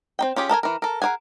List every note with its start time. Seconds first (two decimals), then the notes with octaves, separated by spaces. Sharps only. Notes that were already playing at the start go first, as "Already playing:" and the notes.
0.19 C4 D#4 G5
0.36 C#4 F4 G4 G#4
0.49 A4 A#4 D#5 G#5
0.63 E3 A#4
0.82 A4 A#4
1.02 G#4 A#4 C#5 F#5 G#5